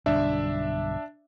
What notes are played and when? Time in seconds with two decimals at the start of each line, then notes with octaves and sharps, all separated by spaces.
0.06 B1 G2 D3 D4 E5